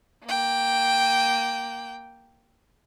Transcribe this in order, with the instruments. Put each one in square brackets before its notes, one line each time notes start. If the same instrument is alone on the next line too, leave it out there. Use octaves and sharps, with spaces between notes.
[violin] A#3 G5